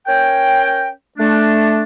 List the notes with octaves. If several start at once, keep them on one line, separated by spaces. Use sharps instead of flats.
C#4 A#4 C#5 G5
A3 D4